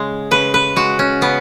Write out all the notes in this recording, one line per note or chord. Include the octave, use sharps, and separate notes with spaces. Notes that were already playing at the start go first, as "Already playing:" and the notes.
Already playing: C#3 G#3
C#3 B4
B4
G#3 F#4
C#4
C#3 B3